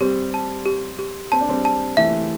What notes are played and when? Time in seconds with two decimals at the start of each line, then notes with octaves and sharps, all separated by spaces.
0.01 G3 C4 G4
0.34 A5
0.66 G4
0.99 G4
1.32 C4 A5
1.41 D4
1.49 G3 C4
1.65 A5
1.97 E3 A3 E5